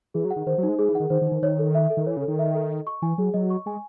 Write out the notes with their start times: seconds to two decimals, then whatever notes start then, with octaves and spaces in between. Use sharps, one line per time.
0.14 E3 G#4
0.25 F#3
0.31 F#5
0.36 D#3
0.47 D#3 C5
0.58 F#3
0.63 D#4
0.69 G#3
0.79 G#3 G#4
0.89 E3
0.95 D#3 F#5
1.10 D#3 C5
1.22 D#3
1.26 D#4
1.32 D#3
1.42 D#3 C#5
1.59 A4
1.75 E5
1.90 A4
1.97 D#3
2.06 E3 C#5
2.17 C#3
2.22 A4
2.28 D#3
2.39 E5
2.55 A4
2.70 D#5
2.87 C#6
3.02 E3 G#5
3.18 F#3 G#4
3.34 F#3 D#5
3.50 C#6
3.66 G#3 G#5